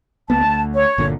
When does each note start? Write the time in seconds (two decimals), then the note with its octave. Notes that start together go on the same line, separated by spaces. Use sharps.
0.30 C#2 A#3 B3 A5
0.41 D2
0.74 C#5
0.98 G1 A#2 D3